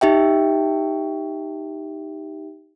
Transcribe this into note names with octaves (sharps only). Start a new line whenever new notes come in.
D#4 G4 E5 G5